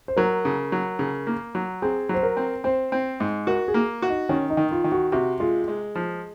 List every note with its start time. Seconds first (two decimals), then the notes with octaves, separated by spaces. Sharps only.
0.08 C5
0.17 F#3 A#4
0.45 C#3
0.72 F#3
0.99 C#3
1.27 A#3
1.55 F#3
1.82 C4 G#4
2.09 F#3 C5
2.23 A#4
2.37 C4
2.64 C4 C5
2.92 C4
3.20 G#2
3.47 F#4 A#4
3.68 G#4
3.74 A#3
4.02 F#4
4.09 D#4
4.29 D#3 C#4
4.50 D#4
4.57 D#3
4.71 F4
4.84 D#3
4.92 F#4
5.12 C3 F#4
5.40 G#3 F4
5.68 G#3
5.95 F3